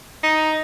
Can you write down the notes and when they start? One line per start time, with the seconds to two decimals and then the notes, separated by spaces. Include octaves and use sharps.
0.23 D#4